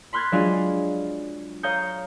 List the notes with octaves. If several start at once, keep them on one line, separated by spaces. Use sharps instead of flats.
B5 C6 F6 F#6 G#6 A6
F#3 G#3 D4 F4 G#4 F5
C#5 F5 A#5 D#6 G6 C#7